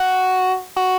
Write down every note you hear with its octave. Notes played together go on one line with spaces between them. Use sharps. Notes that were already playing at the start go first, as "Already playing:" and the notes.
Already playing: F#4
F#4